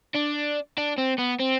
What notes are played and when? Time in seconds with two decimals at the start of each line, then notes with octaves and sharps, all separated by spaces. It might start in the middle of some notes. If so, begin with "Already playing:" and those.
0.15 D4
0.78 D4
0.98 C4
1.18 B3
1.39 C4